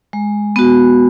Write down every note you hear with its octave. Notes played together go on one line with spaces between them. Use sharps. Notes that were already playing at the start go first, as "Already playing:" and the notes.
G#3
B3 F#4